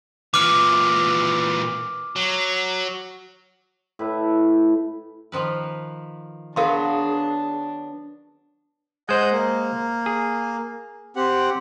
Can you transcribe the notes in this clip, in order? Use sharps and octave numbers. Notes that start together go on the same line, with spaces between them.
A#2 E3 D6 F6
F#3
A2 B4 E5
D#3 F3 B4
F#3 B3 D4 F#4 G#4 A#4 F5 C6
G#3 C5 D#5 F#5 G6
A#3
G#4
C4 G4 F#5